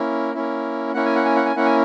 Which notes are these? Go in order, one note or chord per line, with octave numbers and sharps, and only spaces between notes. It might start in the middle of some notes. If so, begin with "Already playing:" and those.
Already playing: A#3 C#4 E4
A#3 C#4 E4
A#3 C#4 E4 F#5
G#5
F#5
G#5
F#5
G#5
A#3 C#4 E4 F#5
G#5